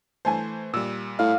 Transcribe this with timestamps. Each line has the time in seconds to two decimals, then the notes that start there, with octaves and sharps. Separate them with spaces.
0.25 E3 A3 C5 G#5 A5
0.74 A#2 G3 E6
1.19 A2 F5